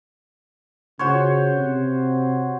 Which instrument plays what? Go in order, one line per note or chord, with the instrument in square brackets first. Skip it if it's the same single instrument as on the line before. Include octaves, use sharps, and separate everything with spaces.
[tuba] C#3 [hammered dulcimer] F#4 C5 C#5
[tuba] C3